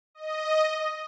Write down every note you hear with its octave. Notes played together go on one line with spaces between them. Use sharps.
D#5